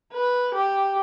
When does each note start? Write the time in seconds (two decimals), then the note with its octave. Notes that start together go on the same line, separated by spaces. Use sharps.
0.13 B4
0.54 G4